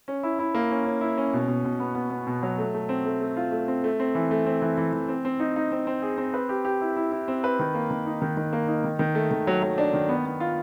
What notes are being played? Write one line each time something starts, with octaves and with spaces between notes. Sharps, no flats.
C#4
E4
E4
A#3
C#4
C#4
E4
C#4
B2
B2
B2
B3
B3
B3
B2
F#3
A3
A3
C4
A3
A3
F4
A3
C4
A3
C4
E3
A3
C4
E3
E3
E3
C4
C4
D#4
D#4
C4
C4
G#4
C4
B4
G4
G4
E4
E4
E4
C4
B4
D#3
A#3
D#3
D#4
D#3
D#3
A#3
D#4
D#3
D#3
A3
D#3
F#3
F#3
D4
D#3
B3
B3
F4